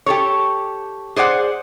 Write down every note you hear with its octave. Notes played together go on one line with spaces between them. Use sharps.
G4 A4 C#5
G#4 C5 D5 F#5